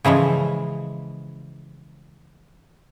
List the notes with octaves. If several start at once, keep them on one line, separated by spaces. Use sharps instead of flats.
C#3 E3 F3 G#3